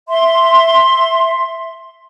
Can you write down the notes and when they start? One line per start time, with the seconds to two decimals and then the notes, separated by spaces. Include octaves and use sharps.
0.09 E5 C6